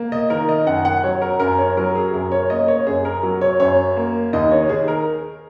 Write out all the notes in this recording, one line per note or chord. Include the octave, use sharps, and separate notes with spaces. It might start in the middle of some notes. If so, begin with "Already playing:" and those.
Already playing: A#3
D#5
D#3 A#4
D#5
F#2 F#5
F#5
F#3 C#5
A#4
F#2 A#4
C#5
F#3 A#4
G#4
F#2 A#4
C#5
A#3 D#5
C#5
F#2 G#4
A#4
F#3
C#5
F#2 C#5
A#3
D#2 D#5
C#5
D#3 G#4
A#4